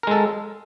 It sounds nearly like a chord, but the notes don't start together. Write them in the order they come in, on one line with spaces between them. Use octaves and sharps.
A#4 G#3 A4